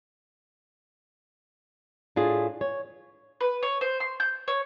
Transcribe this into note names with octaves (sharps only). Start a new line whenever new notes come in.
A2 D4 F4 G#4
C#5
B4
C#5
C5
C6
G6
C#5